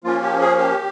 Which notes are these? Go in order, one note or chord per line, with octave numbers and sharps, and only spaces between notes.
F3 A#3 C#4 F4
G4
G#4
G4